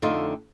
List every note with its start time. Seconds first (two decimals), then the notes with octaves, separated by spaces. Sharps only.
0.02 F2 D3 A3 D#4 F4